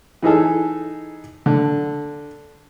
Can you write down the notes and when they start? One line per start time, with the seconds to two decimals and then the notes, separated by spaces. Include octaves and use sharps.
0.23 E3 D#4 G#4 A4
1.46 D3